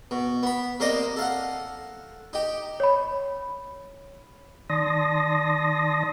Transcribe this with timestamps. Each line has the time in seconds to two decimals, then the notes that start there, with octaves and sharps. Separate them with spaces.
0.11 B2
0.43 B3 B5
0.80 C3 A#3 C5 D5 D#5
1.17 A4 F5 F#5
2.33 D#4 G4
2.80 C#5 B5
4.70 D#3 D5 A5 C6 D#6 A#6